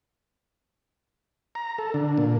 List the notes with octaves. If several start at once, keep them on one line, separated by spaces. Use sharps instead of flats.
A#5
A4
D3
A#2